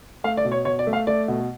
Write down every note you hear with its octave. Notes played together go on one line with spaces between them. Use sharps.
A3 F5
D5
B2
C#5
B2 C#5
D5
A3
F5
A3 D5
B2